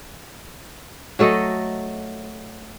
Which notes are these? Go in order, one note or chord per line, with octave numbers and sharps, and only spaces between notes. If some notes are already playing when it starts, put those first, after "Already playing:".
F#3 A3 A4 D#5